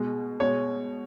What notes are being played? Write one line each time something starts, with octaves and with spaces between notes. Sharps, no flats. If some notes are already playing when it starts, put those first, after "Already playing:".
Already playing: B2 G#3
B2 G#3 C#5